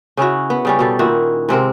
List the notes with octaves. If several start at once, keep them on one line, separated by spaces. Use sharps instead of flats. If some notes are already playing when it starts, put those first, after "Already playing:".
C#3 C#4 E4 F#4
B3
C#3 G3 C#4
B2 G3 A4
A#2 D#3 E4 F#4
G#2 C3 C4 A#4